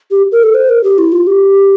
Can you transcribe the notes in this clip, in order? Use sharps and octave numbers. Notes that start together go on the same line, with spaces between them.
G4
A#4
A4
C5
A#4
G4
E4
F4
G4